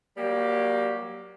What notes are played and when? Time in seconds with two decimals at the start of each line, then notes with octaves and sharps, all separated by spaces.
0.17 F#3 G3 A#3 G4